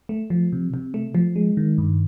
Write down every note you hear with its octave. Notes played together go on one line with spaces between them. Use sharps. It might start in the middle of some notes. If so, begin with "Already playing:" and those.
A3
F3
C3
C3
A3
F3
G#3
D#3
G2